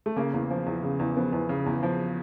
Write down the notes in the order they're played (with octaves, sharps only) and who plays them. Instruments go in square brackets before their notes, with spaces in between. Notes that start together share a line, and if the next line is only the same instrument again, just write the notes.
[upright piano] A3
C#3 A#3
E2
F3
E2
C#3
E2
F3 B3
E2
C#3
E2
F3